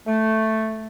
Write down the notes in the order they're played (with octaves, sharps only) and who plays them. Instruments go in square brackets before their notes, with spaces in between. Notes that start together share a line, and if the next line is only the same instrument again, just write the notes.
[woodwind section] A3